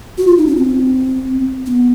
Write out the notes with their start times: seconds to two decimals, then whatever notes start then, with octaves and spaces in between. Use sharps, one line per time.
0.18 F#4
0.27 F4
0.38 D#4
0.47 C#4
0.56 C4
1.66 C4
1.71 B3